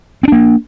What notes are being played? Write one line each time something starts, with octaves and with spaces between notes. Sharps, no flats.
A#3 C4 D4